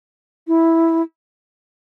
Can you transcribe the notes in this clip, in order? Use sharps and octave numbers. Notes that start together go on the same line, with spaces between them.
E4